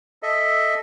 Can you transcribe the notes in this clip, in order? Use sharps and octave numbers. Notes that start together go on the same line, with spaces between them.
A4 D#5 E5